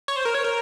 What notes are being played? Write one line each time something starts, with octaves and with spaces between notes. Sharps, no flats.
C#5
C5
A#4
C#5
A#4